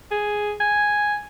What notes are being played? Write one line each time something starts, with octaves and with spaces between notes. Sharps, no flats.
G#4
G#5